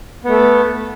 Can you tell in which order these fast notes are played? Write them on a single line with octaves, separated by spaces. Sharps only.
B3 A3 A4